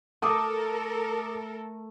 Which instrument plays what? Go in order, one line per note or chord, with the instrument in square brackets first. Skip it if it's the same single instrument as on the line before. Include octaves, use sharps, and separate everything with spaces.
[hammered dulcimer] A3 [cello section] A4 A#4 [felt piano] D6 D#6